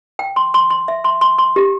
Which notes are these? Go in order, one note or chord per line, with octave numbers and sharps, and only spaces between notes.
G5
C6
C6
C6
E5
C6
C6
C6
G4